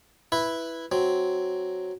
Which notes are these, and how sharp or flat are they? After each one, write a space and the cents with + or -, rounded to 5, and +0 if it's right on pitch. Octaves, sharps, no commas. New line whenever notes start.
E4 +0 B4 +0 E5 +0
F#3 +0 C4 +0